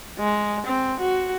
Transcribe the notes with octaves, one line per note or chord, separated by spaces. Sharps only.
G#3
C4
F#4